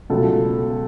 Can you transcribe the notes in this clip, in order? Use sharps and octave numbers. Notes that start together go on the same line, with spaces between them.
C#2 B2 F#3 A3 A4